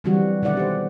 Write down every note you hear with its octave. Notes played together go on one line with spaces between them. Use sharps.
D3 E3 F#3 G3 C4 F#4
B2 D3 D#3 E4 D5 F#5
G4 C5